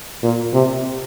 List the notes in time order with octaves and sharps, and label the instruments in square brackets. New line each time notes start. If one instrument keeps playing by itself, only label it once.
[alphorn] A#2
C3